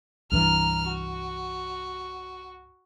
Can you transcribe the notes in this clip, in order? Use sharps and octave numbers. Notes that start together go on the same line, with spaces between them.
C2 G2 E3 A#5 F6
F#4